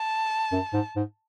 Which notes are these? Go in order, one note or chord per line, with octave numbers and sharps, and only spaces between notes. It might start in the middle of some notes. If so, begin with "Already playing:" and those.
Already playing: A5
F#2
G#2
G#2